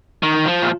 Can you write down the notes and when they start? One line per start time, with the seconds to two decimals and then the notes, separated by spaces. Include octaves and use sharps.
0.23 D#3
0.46 F3
0.62 A#2